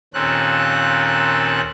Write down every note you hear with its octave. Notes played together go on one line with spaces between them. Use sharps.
D#2 A#2 C4 C#4 A4 F#6